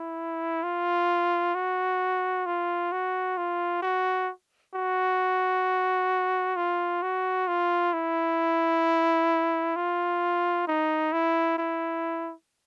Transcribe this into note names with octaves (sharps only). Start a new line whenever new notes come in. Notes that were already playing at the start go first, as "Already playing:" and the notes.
Already playing: E4
F4
F#4
F4
F#4
F4
F#4
F#4
F4
F#4
F4
E4
F4
D#4
E4
E4